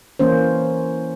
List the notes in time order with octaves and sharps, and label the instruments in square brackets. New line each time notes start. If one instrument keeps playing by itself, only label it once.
[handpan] E3 A#3 C#4 C5